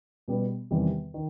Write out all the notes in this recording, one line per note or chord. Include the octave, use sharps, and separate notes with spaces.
B2 G3 B3
E2 C3 D#3 G3
D#3